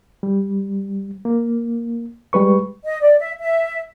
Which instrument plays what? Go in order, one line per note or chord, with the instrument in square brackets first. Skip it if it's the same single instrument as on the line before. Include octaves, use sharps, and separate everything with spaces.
[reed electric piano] G3
A#3
G3 G#3 B4 C#6
[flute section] D#5
D5
E5
E5